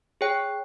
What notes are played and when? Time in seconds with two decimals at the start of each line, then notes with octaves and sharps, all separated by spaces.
0.21 G#4 C#5 G5